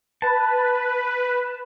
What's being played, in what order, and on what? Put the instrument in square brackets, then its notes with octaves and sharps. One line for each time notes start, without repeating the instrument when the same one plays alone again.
[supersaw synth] B4 [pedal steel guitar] A5